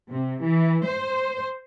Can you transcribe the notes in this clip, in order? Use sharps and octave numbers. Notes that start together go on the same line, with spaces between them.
C3
E3
C5